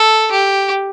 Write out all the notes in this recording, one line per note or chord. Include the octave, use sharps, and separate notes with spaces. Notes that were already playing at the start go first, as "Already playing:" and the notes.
Already playing: A4
G4